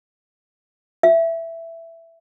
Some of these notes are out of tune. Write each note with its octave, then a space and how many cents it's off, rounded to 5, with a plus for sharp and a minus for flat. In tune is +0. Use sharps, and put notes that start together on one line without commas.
E5 +10